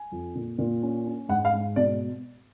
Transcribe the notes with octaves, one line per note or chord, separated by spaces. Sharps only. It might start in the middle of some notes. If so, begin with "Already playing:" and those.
Already playing: G#5
F2
A#2
A#2
C#4
C#4
G#2 F#5
F5
G#2
B2 D5